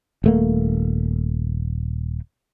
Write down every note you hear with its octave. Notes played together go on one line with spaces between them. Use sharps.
D#1 A3 A#3